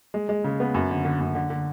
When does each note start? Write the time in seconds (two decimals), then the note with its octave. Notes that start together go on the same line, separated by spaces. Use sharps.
0.14 G#3
0.29 G#3
0.44 C#3
0.60 B3
0.74 F#2
0.90 D3
1.05 D3
1.20 F#2
1.35 D3
1.50 D3